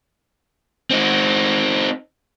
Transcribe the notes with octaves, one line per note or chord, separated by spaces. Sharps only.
C4 D#4